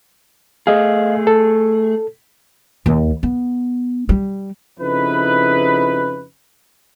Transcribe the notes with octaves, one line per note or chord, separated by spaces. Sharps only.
A3 G#4 D#5 F5
A4
D#2
B3
G3
F2 C#3 D#4 E4 B4